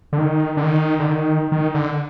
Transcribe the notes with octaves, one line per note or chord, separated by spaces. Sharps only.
D3
D#3
D3
D#3
D3
D#3
D#3
D3